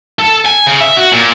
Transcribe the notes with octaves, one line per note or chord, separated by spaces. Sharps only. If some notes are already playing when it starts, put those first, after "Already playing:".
A4
G#5
C#3
E5
F#4
A#2